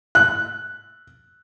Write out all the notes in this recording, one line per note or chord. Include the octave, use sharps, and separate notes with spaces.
F#6